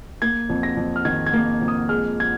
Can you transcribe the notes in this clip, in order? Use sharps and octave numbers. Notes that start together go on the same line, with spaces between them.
A#3 G#6
F2
A#6
F2
F6
D#3 G#6
G#6
A#3
F2
D#6
G#3 F6
G#6